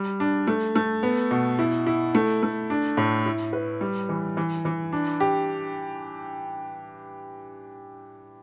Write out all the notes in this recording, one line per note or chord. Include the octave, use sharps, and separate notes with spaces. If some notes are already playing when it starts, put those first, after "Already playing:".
Already playing: G3
D4
A3
A3
B3
B2
E4
E4
A3
A3
D4
A2
E4
B4
G3
E3
E3
E3
D4
G4